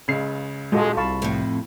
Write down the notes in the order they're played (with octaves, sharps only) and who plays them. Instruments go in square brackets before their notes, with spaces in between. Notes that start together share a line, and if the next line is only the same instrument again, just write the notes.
[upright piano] C#2 C#3 C7
[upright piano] D#1 [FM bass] G#3 [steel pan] F4 F#4 A4
[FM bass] C2 [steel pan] F5 A5 [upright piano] B5 C#6
[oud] F2 A2